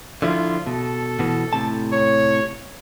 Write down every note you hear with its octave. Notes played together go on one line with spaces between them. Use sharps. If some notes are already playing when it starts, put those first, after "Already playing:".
D3 F3 E4 F4
B2 A4
B2 E3
A2 C3 A5
C#5